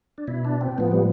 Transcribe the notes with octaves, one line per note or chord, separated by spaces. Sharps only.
D4
B2 E4
D4
C4
A2 F3 B3
G3